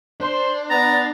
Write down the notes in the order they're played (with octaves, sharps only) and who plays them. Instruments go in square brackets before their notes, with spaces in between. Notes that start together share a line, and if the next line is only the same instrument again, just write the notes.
[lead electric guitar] D4 [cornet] C5 [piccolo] C6
[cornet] B3 [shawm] A#5 [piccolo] A6